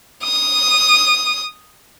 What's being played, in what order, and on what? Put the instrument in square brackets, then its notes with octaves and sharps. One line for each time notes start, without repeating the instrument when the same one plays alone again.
[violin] D#6